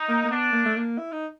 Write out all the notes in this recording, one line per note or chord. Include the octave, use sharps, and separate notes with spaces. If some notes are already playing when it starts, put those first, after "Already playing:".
Already playing: D#4
A#3
A#3
B3 D4
A#3
A3
A#3
E4
D#4